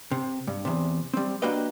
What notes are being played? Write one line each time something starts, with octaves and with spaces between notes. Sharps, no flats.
C3
G2
E2 C3
G3 C4
A#3 D4 F#4 G4 B4 D#5